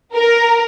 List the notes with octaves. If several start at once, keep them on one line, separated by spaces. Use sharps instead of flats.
A#4